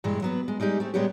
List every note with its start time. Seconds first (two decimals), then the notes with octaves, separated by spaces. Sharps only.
0.04 G2 A#2 E3 G#3
0.22 F#3 B3 B4
0.48 G#3
0.60 G3 G#3 D#4 G4
0.80 A3 C4
0.94 A#2 G3 G#3 B3 C#4 G4